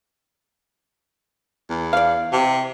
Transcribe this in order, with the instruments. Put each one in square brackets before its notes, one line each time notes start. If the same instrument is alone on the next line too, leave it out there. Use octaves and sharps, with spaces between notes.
[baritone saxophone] E2
[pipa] D5 F5
[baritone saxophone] C3